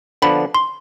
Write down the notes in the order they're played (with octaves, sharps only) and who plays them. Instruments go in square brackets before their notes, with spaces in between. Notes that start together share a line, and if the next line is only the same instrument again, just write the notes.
[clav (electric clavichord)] D3 F3 B3 D4 [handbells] B5
[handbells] C6